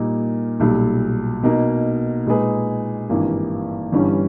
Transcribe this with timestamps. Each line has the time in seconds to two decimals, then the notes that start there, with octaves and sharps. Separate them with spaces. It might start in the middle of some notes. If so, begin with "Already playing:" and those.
Already playing: A#2 G3 A#3 D#4 A#4
0.60 B1 A#2 G3
1.43 B2 A#3 D#4
2.26 A#2 G#3 D#4 G#4 B4
3.09 G#1 G2 E3 G3 A#3
3.92 G1 G2 E3 G3 C#4